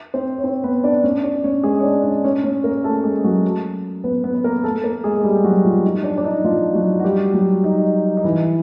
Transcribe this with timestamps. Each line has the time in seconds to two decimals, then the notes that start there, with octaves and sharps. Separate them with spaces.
0.14 C4 C5
0.38 C#5
0.44 C4 C5
0.64 B3 B4
0.84 D4 D5
1.04 C#4 C#5
1.23 D4 D5
1.44 C#4 C#5
1.63 G#3 G#4
1.80 C#5
1.83 D4 D5
2.04 D4 D5
2.24 C#4 C#5
2.44 C#4 C#5
2.64 A#3 A#4
2.84 A3 A4
3.04 G#3 G#4
3.24 F#3 F#4
4.04 B3 B4
4.24 B3 B4
4.34 B4
4.44 A#3 A#4
4.64 A3 A4
4.84 A#3 A#4
5.04 G#3 G#4
5.16 G#4
5.24 G3 G4
5.44 F#3 F#4
5.64 F3 F4
5.84 D#4
6.04 D4
6.18 D4
6.24 D#4
6.44 F3 F4
6.74 F#3 F#4
7.00 F#4
7.04 G3 G4
7.34 F#3 F#4
7.64 D#4
8.17 D#4
8.24 E3 E4